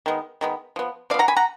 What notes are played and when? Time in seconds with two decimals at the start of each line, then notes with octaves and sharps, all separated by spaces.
0.06 D#3 G#3 B3
0.41 D#3 G#3 B3
0.76 F3 B3
1.10 F3 D5 F5
1.14 B3
1.19 F#5 A#5
1.28 G#5 B5
1.37 F#5 A#5